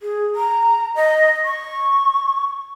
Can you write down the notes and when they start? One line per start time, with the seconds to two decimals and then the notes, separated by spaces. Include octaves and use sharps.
0.01 G#4
0.36 A#5
0.96 D#5
1.45 C#6